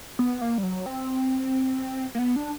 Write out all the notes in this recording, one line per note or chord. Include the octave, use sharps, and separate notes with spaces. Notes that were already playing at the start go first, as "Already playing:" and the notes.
B3
A#3
G3
F#3
C4
A#3
B3
D4